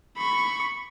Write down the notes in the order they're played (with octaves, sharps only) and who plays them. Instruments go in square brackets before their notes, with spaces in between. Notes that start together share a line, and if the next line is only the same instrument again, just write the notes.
[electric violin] B5 C#6